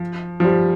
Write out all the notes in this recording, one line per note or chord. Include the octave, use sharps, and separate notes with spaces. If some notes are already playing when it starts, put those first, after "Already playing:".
Already playing: F3
F3
G3